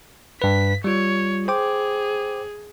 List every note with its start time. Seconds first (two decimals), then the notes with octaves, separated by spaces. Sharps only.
0.42 G2 B4 B6
0.84 G3 F4 C#5
1.48 G#4 C5 G5 D6